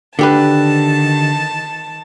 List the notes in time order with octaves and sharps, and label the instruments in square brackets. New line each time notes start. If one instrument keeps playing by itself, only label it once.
[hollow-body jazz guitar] D3 G4 B4 [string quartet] D#3 A5